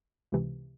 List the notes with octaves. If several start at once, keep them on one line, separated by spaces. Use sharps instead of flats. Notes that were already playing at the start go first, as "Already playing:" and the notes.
C#2 C3 E3